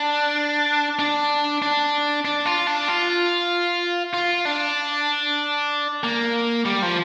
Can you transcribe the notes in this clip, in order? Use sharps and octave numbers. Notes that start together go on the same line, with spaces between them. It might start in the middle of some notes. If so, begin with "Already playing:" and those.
Already playing: D4
D4
D4
D4
F4
D4
F4
F4
D4
A#3
G3
F3